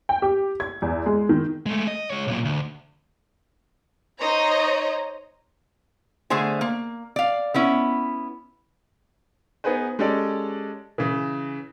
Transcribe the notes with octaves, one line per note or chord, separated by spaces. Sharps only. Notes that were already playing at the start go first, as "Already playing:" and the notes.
G5
G4
G#6
E2
G#3
D#3
G#3 A3
D#5
G#3 C#5
B1 A#2
D2
D#4 C5 C#5 D#5 A#5
D3 A3 G#4 C5 G#5
A#3
D5 F5
B3 C#4 E4
B3 D#4 G#4 B4 C5
G#3 C#4 G4 A4 D5
C#3 E3